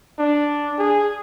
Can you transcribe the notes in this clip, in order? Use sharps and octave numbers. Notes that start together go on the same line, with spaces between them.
D4
G#4